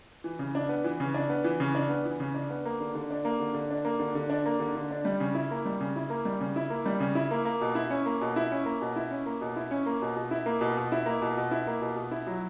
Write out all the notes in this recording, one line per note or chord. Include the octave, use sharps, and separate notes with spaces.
E3
C#3
D4
B3
E3
C#3
D4
B3
E3
C#3
D4
B3
E3
C#3
D4
B3
A#3
D3
D3
D4
A#3
D3
D3
D4
A#3
D3
D3
D4
A#3
D3
D3
D4
G3
C#3
E4
A#3
G3
C#3
E4
A#3
G3
C#3
E4
A#3
G3
C#3
E4
A#3
A#3
B2
E4
C#4
A#3
B2
E4
C#4
A#3
B2
E4
C#4
A#3
B2
E4
C#4
A#3
B2
B2
E4
A#3
B2
B2
E4
A#3
B2
B2
E4
A#3
B2
B2
E4
F#3